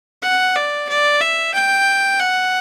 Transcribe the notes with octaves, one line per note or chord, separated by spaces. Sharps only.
F#5
D5
D5
E5
G5
F#5